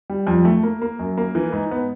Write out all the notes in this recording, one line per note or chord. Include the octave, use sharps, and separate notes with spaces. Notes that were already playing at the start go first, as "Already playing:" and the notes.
G3
F2
A3
A#3
A#3
F#2
A#3
E3
G#2
B3